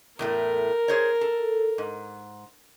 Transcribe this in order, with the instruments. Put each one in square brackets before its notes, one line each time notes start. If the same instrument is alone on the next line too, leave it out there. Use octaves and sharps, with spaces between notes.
[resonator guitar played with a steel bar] E2 A2 A3 [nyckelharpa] A#4
[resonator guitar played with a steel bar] G#4 C5 C#5
A4
G#2